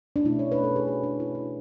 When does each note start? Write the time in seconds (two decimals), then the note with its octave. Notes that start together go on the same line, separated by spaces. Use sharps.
0.16 D4
0.25 B2 A3 C#4 E4
0.39 C#5
0.52 B4
0.64 A4
0.76 G#4
0.87 F#4
1.03 D4
1.20 E4
1.35 E4